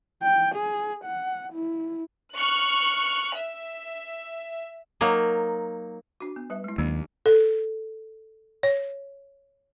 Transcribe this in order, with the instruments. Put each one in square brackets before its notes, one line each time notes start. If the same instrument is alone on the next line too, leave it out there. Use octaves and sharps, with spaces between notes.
[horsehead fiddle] G5
G#4
F#5
E4
[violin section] C#6 F6 F#6
E5
[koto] F#3 A#3 D#4
[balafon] D4 F#4
B3
G3 B4 E5
G#3 E4
[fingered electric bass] D#2 [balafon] F#3 A#3 D4
[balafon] A4
C#5